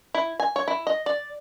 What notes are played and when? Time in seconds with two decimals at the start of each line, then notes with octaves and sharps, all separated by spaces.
0.14 E4
0.40 G#5
0.56 C#5
0.68 E4
0.87 D#5
1.06 D5